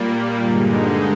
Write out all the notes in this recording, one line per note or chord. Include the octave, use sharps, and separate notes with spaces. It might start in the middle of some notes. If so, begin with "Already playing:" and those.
Already playing: A#2 G3 A#3
G2 D3 G#3 D#4